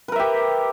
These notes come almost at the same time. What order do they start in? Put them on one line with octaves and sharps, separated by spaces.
B4 A#4 E5 G4